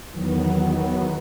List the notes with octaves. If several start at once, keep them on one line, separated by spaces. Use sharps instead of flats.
E2 D#3 F#3 B3